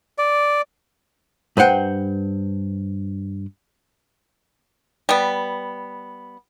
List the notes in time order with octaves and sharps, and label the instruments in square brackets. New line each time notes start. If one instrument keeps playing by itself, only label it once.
[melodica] D5
[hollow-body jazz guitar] G2 B4 C5 F#5 G5
[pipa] G3 B3